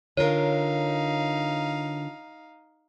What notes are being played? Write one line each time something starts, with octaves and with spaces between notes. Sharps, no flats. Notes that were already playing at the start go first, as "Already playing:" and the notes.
D3 D#4 F4 A#4 C#5 F5